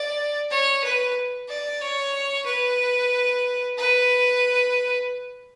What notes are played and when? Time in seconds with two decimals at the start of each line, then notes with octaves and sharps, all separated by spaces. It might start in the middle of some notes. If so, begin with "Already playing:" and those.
Already playing: D5
0.50 C#5
0.83 B4
1.48 D5
1.81 C#5
2.46 B4
3.77 B4